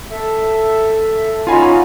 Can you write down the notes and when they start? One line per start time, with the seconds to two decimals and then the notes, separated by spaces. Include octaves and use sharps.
0.11 A4 E5
1.47 C#4 D#4 F4 F#4 G#5 B5